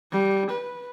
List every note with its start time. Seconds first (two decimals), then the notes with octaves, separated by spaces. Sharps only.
0.12 G3
0.51 B4